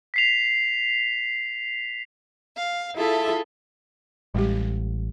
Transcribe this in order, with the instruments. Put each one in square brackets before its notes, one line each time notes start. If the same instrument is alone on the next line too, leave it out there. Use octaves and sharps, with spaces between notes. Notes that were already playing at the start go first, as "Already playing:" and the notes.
[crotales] B6 C7 F7
[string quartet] F5
E4 F4 G#4 A4 E5
[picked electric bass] A1 [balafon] G3 G#3 G4